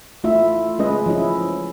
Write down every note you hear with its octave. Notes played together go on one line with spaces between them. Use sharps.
A3 E4 F4 E5
G#3 C#4 B4 D#5
F3 C#4 E4